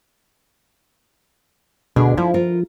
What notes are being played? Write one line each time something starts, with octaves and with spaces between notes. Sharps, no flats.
D2 B2 D4 G#4
F3 E4
F4 A#4